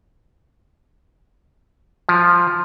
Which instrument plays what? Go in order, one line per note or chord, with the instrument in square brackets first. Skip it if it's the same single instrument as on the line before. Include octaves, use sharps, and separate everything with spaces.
[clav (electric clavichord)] F3